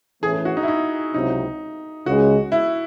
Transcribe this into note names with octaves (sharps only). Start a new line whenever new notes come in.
A2 E3 A3 C#4 E4 G#4
G#4
F#4
D#4
E4
D#4
C#2 C3 F#3 C4 D#4 E4
C#2 C#3 G#3 F#4
E4